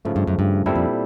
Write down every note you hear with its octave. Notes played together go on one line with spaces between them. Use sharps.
G#2 C#3 F3 A3
G2
F#2
G2
F#2 A#2 G3 C4 E4 A4
F2